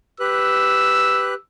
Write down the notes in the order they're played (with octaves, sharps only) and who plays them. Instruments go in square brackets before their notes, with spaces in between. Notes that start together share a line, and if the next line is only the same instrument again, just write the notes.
[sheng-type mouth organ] G4 B4 F#6 [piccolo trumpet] E6